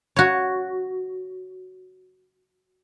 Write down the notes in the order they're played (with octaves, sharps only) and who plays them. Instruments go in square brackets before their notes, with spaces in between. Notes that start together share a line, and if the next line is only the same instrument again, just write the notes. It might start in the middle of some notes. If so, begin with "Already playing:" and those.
[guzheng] F#4 C#5